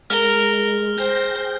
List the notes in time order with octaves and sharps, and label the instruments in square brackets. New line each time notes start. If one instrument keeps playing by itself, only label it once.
[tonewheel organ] G#3 [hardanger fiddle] A#4 [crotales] F6 G7
[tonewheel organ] G#4 G5 A#6 [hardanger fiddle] C5